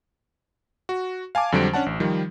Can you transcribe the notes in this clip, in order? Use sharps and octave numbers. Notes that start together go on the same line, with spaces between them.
F#4
F5 G#5 A5 D6
F2 D3 F#3 G3 C5 D7
C#4 D4 F#5 A5
A1
D#3 F3 G3